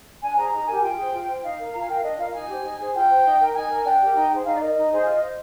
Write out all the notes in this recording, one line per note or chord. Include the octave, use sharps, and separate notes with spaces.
D4 G#5
G#4 C5 A#5
D#4 A#5
G4 A#4 G#5
F4 G5
G#4 C5
F4
C5
D#4 F5
A#4
F4 A#5
G#5
A#4 G5
F5
D4 D#5
F4 A#4 F5
D#4 G#5
G4 C5
D#4
G#4 C5
F4 G5
C5
D#4
A#4
D#4 G#5
A#4
D4 G5
G4 A#4
D#4
G#4 C5
D#4 F5
D5
A#4 D#5
D#4
G#4 C5
F4
C5